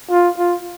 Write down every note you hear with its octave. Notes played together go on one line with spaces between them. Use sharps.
F4
F4